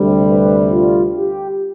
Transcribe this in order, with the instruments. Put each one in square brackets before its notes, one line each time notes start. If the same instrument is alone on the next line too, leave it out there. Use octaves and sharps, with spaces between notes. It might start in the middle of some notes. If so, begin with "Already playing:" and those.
Already playing: [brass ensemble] D2 C3 G3
[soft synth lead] B4
F4
G4